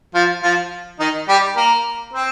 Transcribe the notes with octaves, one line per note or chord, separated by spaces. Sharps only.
F3 F4
F3 F4
D#3 D#4
G3 G4
A#3 A#4
C4 C5